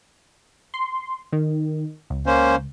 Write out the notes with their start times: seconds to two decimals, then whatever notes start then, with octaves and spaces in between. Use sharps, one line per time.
0.74 C6
1.32 D#3
2.10 C#2
2.26 A#3 C#4 C5